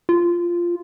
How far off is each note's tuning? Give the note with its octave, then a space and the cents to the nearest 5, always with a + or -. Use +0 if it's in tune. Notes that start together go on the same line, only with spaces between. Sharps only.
F4 -10